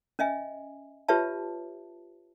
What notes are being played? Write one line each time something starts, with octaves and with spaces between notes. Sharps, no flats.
C#4 D#5 E5 G#5
F4 G4 B4 C#5 E5 A5